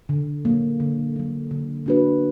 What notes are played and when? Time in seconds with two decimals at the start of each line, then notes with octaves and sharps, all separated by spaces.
0.09 D3
0.45 F#3 A#3
0.80 D3
1.16 F#3 A#3
1.51 D3
1.86 A#3 D4 F#4 B4